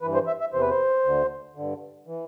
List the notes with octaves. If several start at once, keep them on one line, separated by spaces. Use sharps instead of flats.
G2 E3 B4
C5
E5
E5
E2 C3 E3 C5
B4
C5
D2 D3
G2 D3
E3